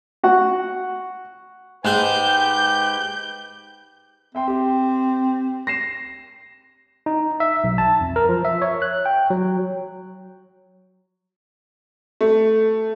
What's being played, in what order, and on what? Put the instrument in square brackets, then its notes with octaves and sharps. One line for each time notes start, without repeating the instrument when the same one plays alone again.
[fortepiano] F#4 F#5
[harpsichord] G#2 G#4 [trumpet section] G4 B4 G5 [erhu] G6
[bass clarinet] C4 [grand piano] E5 G5 C6
[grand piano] G4
A#6 C7 E7
[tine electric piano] D#4
E5
B1
A5
F2
A#4
F3
E5
C#5
F#6
G5
F#3
[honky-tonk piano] A3